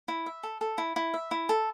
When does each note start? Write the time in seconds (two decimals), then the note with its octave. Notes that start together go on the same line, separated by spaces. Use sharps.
0.08 E4
0.26 E5
0.43 A4
0.61 A4
0.78 E4
0.96 E4
1.14 E5
1.31 E4
1.49 A4